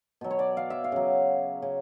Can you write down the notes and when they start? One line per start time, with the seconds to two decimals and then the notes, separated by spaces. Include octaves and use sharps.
0.21 B2 F#3
0.31 C#5
0.39 D5
0.57 F5
0.70 E5
0.84 F5
0.92 C#3 F#3
1.62 C#3